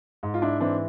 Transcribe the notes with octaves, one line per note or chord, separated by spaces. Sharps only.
G#2
F4
D4 E4
E3 C4 D4